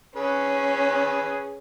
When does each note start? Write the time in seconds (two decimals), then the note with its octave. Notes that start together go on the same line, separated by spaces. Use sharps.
0.16 C#4 G#4 B4